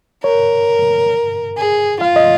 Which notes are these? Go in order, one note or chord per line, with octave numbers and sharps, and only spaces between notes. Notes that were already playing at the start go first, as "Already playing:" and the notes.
A#4 C#5
G#4
F4 F5
D#5